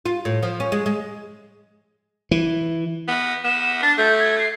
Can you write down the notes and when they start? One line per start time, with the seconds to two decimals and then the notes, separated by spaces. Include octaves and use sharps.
0.06 F4
0.25 A2
0.43 F3
0.60 C#4
0.72 G#3
0.86 G#3
2.31 E3
3.08 B3
3.44 B3 E7
3.83 D4 A6
3.98 A3 G6
4.20 G#6
4.39 C7